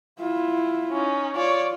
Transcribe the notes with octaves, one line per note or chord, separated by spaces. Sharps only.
E4 F4
C#4 D#4
F4 C#5 D5